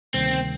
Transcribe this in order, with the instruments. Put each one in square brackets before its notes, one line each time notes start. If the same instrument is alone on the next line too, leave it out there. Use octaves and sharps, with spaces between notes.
[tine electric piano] D2 C3 D#3 G3 A#3 [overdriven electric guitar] C4